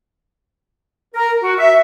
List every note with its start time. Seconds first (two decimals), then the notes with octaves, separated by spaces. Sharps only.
1.14 A#4
1.42 F#4
1.59 E5